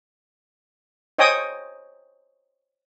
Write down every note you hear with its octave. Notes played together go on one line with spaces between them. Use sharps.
C5 C#5 D#5 G5 G#5 D#6